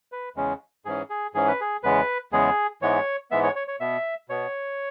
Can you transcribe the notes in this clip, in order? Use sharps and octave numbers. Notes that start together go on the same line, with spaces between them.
B4
E2 C#3 G#3 C#4
G#2 E3 C#4 G#4
G#4
G#2 E3 C#4 G#4
B4
G#4
E2 C#3 G#3 B3 B4
E2 C#3 G#3 B3 G#4
G#2 E3 G#3 B3 C#5
G#2 E3 G#3 B3 E5
C#5
C#5
C#5
B2 B3 E5
B2 B3 C#5